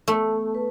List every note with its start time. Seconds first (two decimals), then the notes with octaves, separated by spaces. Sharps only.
0.08 A3 B3
0.55 B4